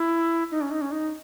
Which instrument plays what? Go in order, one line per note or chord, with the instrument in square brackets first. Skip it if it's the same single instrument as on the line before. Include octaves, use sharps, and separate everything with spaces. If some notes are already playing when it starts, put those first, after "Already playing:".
Already playing: [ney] E4
D#4
C#4
D#4
C#4
D#4